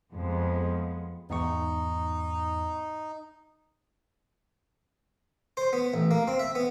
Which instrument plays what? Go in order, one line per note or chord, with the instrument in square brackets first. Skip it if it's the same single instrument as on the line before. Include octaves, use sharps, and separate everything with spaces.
[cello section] F2 F3 G#3 B3
[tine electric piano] E2 G#2 C#6 [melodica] D#4
[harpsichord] C5
B3
A1
A#3
C4
E5
B3